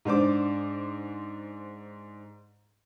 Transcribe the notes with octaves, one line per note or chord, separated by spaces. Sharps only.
G#2 D4 C5 D6